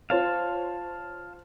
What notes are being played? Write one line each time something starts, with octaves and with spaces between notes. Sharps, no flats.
F4 C5 C#5 F5 A5